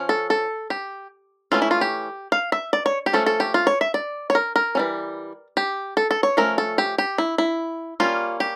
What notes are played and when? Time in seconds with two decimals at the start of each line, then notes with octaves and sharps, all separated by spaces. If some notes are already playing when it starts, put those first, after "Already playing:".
Already playing: F3 C#4
0.09 A4
0.30 A4
0.70 G4
1.52 E3 A3 C#4 F4
1.62 E4
1.71 F4
1.81 G4
2.32 F5
2.52 E5
2.73 D5
2.86 C#5
3.06 G4
3.13 F3 A3 C#4 A4
3.26 A4
3.40 G4
3.54 F4
3.67 C#5
3.81 E5
3.94 D5
4.30 C#5
4.35 A#4
4.56 A#4
4.75 E3 G3 C#4
5.57 G4
5.97 A4
6.11 A4
6.23 C#5
6.37 F3 A3 C#4 A#4
6.58 A4
6.78 G4
6.98 G4
7.18 E4
7.38 E4
8.00 G3 A#3 C#4 F4
8.40 G4